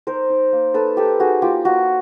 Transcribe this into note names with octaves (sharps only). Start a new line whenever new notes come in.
D#4 A#4 C5
D#4
A#3
D#4 A4 B4
D#4 G4 A4
D#4 F#4 G#4
A#3 F4 G4
A#3 F#4